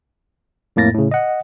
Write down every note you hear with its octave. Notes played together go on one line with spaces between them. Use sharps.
F2 A2 A#3 A6 A#6
A2 C#3
D#5 F#5